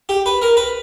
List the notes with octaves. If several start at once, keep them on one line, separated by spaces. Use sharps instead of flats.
G4
B4
A#4
B4